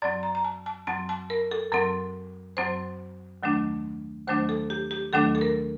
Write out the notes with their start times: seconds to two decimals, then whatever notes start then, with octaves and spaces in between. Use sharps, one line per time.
0.02 F#2 F#3 C4 D5
0.23 A#5
0.35 A#5
0.44 A5
0.66 A5
0.87 F#2 F#3 C4 A5
1.09 A5
1.30 A#4
1.51 A4
1.72 F#2 F#3 C4 A#4
2.57 F#2 F#3 C4 C5
3.43 D#2 D#3 F#3 A3 D4
4.27 D#2 D#3 F#3 A3 D4 C5
4.49 A4
4.70 G4
4.91 G4
5.13 D#2 D#3 F#3 A3 D4 A4
5.35 A4
5.41 A#4